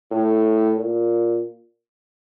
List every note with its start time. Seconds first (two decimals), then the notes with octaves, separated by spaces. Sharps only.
0.11 A2
0.77 A#2